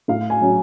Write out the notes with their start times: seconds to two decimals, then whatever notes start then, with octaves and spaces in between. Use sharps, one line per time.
0.08 A2 F5
0.30 G#5
0.41 F#3 C#4